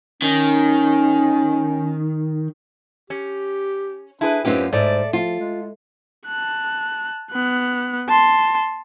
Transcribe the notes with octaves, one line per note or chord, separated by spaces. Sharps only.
D#3 C#4
C#4 G4
D4 E4 G#4 B4
F#2 C4 C#4 D#4 F4 G4 B4
G#2 A3 D5
F3 F4
G#3
A5 F#6
B3 F#6
A5 C6